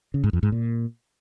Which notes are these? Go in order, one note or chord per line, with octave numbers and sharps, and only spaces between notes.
C#3
G#2
F2
G#2
A#2